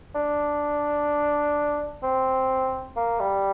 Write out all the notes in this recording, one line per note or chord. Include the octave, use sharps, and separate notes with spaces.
D4
C4
A#3
G3